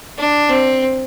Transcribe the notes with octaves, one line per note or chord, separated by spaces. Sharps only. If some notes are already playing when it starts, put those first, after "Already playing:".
D4
C4